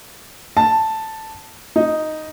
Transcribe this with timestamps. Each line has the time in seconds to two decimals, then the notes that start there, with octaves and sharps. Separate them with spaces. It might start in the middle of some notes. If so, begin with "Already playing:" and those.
0.57 A5
1.76 D#4